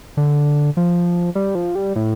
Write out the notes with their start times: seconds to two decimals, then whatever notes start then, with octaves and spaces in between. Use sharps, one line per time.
0.17 D3
0.77 F3
1.35 G3
1.55 F3
1.75 G3
1.96 A2